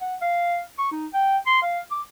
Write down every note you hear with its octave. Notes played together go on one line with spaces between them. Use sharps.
F#5
F5
C#6
D#4
G5
C6
F5
D6